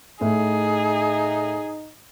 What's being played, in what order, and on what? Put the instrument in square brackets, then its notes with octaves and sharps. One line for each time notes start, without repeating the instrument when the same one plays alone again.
[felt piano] A2 [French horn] D#4 [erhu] G#4